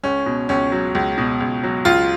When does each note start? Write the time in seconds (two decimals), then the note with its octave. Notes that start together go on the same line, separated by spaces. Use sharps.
0.03 C#2 C#4
0.26 B2
0.49 C#2 C#4
0.72 F#3
0.95 C#2
1.18 B2
1.41 C#2
1.64 F#3
1.85 C#2 F4